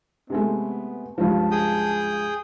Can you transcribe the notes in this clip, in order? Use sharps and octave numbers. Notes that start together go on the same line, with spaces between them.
C3 G#3 A3 B3
C#2 G2 F3 A5
G#4 G5 D#6